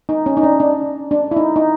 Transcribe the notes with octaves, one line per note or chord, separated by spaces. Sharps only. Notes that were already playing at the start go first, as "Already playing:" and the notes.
D#4
C#4
D#4
D4
D4
D4
E4
D#4
D#4